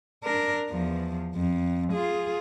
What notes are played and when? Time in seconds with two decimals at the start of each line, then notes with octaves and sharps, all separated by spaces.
0.24 D4 A#4
0.70 E2 F3
1.35 F2
1.93 F4 G#4